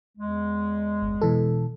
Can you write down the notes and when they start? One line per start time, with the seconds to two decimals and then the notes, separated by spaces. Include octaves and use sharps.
0.18 E2 G#3
1.02 G1
1.22 B2 E3 A4